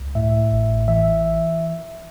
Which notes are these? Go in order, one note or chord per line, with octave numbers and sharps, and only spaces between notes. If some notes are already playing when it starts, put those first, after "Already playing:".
Already playing: C#2
A2 E5
A1
E3 E5